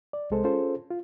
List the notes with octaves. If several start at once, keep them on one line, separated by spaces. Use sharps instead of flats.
D5
C2 C3 G#3 A4 C5
C#4 F4 G#4 A4 C5
F4